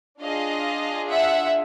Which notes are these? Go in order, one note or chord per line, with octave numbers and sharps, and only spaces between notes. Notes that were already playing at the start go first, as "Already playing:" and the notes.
D4 F4 G#4 D#5 F5
E5 F#5